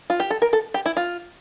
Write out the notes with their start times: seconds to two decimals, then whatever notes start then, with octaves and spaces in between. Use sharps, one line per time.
0.10 F4
0.20 G4
0.30 A4
0.42 A#4
0.53 A4
0.74 G4
0.86 E4
0.97 F4